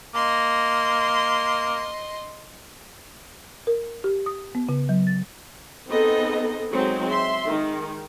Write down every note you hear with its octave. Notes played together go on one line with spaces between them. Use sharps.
A#3 D#5 C6
A#4
G4
D#6
B3
C#3
F#3
A6
B3 C4 D#4 G#4 A4 D#5
F#3 G#3 C4 D#4
E5 C6
D#3 G#3